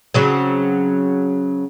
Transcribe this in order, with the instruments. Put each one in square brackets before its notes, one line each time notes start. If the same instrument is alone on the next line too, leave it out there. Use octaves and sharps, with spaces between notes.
[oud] C#3 F#3 C4